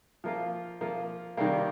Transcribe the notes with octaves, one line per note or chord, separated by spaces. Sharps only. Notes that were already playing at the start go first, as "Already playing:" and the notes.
F3 A#3 F4
F3 A#3 F4
C3 D#3 G3 A#3